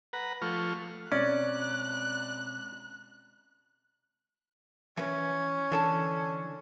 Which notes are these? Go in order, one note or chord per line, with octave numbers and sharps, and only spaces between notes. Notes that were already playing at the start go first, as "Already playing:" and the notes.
B4 F#5 A#5
F3 A3 F4 C#6 F6
B2 G#3 C4 C#4 D5 F#6
E3 C#4 B4
D3 E3 A4 A5